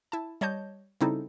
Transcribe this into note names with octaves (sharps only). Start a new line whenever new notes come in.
E4 A5
G3 C#5 D#5 A5 G6
C#3 G3 C4 D#4 E4 A4